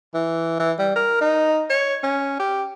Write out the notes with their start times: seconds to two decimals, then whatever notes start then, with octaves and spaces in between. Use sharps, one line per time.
0.14 E3
0.59 E3
0.79 G3
0.96 A#4
1.21 D#4
1.70 C#5
2.03 C#4
2.39 G4